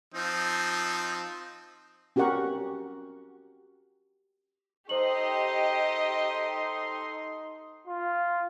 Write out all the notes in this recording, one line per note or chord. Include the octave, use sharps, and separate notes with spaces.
F3 C4 D#4
C#4 F#4 G4 A#4 F#5 C#6
D#4 G4 A4 C5 D#5 C6 F#7
F4